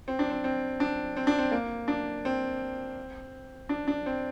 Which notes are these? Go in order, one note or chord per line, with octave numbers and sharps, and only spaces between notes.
C4
D4
C4
C4
D4
C4
D4
C4
A#3
D4
C4
D4
D4
C4